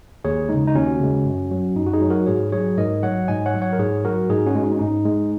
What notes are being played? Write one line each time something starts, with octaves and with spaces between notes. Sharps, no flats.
D#2 G#4 C#5
C#3 G#3 D#4
D#4
D#2 C#4 F#4
C#3 G#3
F#2
F#3
F#2 D#4
F#4
D#4 G#4
F#3
F#4 A#4
G#2 G#4 C#5
F#3 G#4 C#5
G#2 A#4 D#5
F#3 C#5 F#5
G#2 D#5 G#5
C#5 F#5
F#3
C#5 F#5
A#4
G#2 G#4 C#5
F#3 F#4 A#4
G#2 D#4 G#4
C#4 F#4
G#3
D#4
C#4
G#2 D#4
G#3